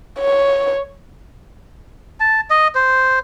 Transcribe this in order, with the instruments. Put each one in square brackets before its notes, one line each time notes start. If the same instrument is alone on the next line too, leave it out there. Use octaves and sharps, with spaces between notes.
[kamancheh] C#5
[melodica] A5
D#5
C5